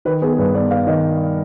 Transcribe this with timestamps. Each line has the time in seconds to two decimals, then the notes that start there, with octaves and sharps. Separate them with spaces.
0.05 D#3 B4
0.22 B3 G#4
0.32 G#4
0.38 G2 B4
0.54 B3 D5
0.71 B3 F5
0.87 D#3 D#5